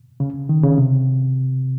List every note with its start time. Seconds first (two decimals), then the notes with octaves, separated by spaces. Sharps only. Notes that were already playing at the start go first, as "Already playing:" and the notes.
0.20 C#3
0.49 D#3
0.63 C#3
0.78 C3